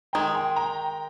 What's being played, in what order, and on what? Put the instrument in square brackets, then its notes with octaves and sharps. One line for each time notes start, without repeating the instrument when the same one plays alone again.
[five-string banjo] D#3 G#3 [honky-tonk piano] G5 A#5
[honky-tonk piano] G#5 C6
G5 A#5